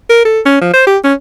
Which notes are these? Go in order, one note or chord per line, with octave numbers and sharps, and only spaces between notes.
A#4
A4
C#4
F3
C5
G4
C#4